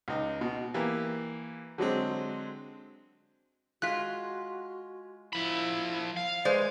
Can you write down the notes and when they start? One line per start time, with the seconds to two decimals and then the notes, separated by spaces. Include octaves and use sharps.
0.08 C#2 D#4
0.41 B2
0.74 E3 A#3 G4
1.78 D3 F#3 G#3 C4
3.82 G#3 F4 F#4 F#6 B6
5.33 F3 E4 B5
6.17 F5
6.45 G#3 B4 C5 D5